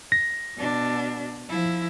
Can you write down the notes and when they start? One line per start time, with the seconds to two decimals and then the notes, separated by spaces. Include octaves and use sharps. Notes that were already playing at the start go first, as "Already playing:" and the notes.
0.12 A#6
0.57 B2 D4
1.49 F3 E4